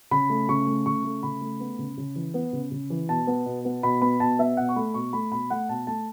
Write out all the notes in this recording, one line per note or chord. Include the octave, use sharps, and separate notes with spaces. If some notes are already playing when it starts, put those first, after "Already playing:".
C#3 B5
A3
C#3 C#6
A3
C#3 C#6
A3
C#3 B5
A3
B3
C#3
C#3
E3
B3
C#3
C#3
E3
B2 A5
B3
B2
B3
B2 B5
B3 B5
B2 A5
B3 E5
B2 F#5
C#6
A3 B5
B2 C#6
A3 B5
B2 B5
A3 F#5
B2 A5
A3 A5